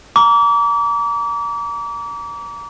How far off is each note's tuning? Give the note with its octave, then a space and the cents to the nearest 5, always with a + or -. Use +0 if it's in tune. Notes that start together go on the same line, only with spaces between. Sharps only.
A#5 +0 D6 -35